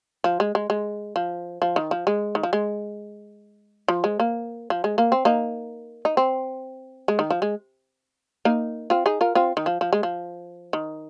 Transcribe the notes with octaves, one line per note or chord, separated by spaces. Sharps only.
F3
G#3
G#3
G#3
F3
F3
D#3
F3
G#3
D#3
F3
G#3
F3
G#3
A#3
F3
G#3
A#3
C4
A#3 D#4
D#4
C4
G#3
D#3
F3
G#3
A#3 D#4
C4 F4
D#4 G#4
F4 A#4
C4 F4
D#3
F3
F3
G#3
F3
D#3